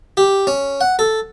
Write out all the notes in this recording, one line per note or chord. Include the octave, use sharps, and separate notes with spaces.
G4
C#4
F#5
A4